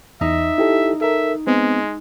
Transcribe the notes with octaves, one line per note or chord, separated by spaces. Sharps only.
E2 D#4 E5
E4 G4 A4
A4 A#4 E5
G#3 B3 C4